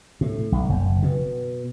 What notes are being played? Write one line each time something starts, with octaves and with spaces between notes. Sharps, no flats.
A2
B1
F#1
B2